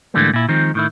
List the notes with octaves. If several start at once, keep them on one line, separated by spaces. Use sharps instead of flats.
G#2 D3 E3 G3 A3 A#3
A#2 E4
D#3 F3 G#3 C4
A2 D#3 E4